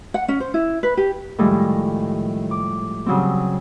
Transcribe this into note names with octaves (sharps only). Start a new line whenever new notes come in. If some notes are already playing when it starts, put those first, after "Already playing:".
F#5
C#4
C5
E4
B4
G4
A2 D#3 F3 G3 G#3
D6
C#3 F#3 G3 C4